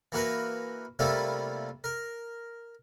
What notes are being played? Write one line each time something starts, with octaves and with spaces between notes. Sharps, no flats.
E3 A#3 F#4 A#4 B4
C3 G3 A3 A#3 E4 F4
A#4